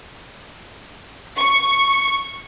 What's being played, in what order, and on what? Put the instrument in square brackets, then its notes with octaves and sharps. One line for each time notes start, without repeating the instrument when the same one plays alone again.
[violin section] C#6